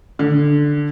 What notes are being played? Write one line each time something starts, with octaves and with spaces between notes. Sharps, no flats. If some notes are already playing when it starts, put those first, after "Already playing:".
D3